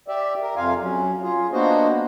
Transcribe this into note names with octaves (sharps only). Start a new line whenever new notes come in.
G4 D5 E5
A#4
F2 C3 F4 F5 G#5
F#3 C#4
F4 G#4
A#3 B3 D4 F#4 C5 D#5